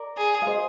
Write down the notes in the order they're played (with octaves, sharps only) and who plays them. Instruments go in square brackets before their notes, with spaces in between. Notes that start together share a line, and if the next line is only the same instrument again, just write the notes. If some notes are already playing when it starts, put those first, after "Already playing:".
Already playing: [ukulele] A#4 D5
[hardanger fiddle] G#4
[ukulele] F5
C5 D#5